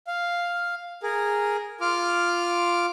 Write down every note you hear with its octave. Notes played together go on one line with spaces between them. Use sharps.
F5
G#4 A#4
F4 D6 F6